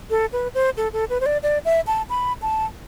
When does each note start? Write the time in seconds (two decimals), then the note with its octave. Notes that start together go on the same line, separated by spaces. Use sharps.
0.10 A4
0.33 B4
0.55 C5
0.77 A4
0.93 A4
1.10 B4
1.21 C5
1.26 D5
1.43 D5
1.65 E5
1.87 A5
2.10 B5
2.42 A5